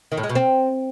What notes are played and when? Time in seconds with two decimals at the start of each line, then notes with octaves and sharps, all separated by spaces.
0.12 D#3
0.18 A2
0.23 G#3
0.29 B2
0.35 C4